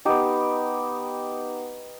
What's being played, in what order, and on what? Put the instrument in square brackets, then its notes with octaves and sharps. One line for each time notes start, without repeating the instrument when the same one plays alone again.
[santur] B3 D#4 G4